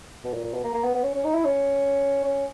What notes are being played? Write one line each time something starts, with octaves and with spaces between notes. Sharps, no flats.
B2
A#2
A#2
B2
A#3
A#3
B3
B3
C#4
C#4
D#4
E4
C#4
C#4